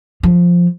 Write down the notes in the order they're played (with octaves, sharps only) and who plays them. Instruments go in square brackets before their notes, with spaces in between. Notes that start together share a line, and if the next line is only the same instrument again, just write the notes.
[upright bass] F3